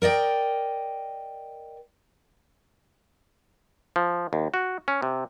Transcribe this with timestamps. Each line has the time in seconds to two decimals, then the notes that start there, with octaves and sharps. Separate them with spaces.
0.02 A#4 D5 D#5 G5
3.96 F3
4.33 D#2
4.54 F#4
4.88 C#4
5.02 C3